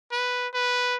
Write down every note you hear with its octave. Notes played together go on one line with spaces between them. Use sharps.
B4
B4